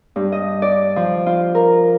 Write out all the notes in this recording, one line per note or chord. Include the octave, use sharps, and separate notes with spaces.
G2
D#5
D5
F3
F4
A#4